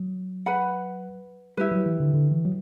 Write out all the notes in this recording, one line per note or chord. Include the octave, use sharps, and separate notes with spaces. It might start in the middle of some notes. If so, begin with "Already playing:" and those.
Already playing: F#3
B4 F#5 B5
G3 E4 G4 B4
F#3
E3
D3
D3
E3
F#3